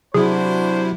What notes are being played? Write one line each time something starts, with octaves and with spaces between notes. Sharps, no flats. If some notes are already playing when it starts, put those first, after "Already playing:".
C3 F#3 D4 E4 F#4 G#4 C5